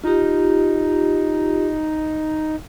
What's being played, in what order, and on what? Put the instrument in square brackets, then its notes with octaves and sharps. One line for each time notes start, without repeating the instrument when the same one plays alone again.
[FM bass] D#4 [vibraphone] F4 G4